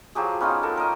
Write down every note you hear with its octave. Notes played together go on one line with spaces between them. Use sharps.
F3 F#3 G4 G#4
B3 C#4 D#4 F4
A4 A#4
A#4 D#5